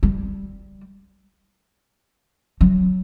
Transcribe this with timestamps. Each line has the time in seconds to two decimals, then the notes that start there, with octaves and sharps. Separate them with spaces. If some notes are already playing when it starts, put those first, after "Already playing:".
0.03 G3
2.61 F#3